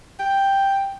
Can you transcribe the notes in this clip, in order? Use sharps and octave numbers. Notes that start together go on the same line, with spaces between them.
G5